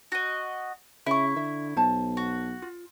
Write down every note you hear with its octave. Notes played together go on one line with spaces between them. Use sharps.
F#4 D#5
C#3 E4 E5 C#6
D3 E5
B1 C5 A5
F#4
F4